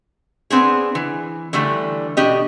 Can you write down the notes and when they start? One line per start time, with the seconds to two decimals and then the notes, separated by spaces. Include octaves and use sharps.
0.50 B3 C4 D4 G#4
0.95 E3
1.53 D3 E3 G3 A3
2.17 B2 D4 G4 D#5